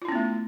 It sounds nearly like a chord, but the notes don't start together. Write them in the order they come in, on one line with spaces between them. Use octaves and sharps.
F4 E4 C#4 B3 A3